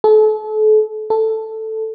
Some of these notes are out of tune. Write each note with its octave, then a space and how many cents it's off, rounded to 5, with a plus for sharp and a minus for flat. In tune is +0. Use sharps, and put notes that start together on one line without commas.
A4 -35
A4 +5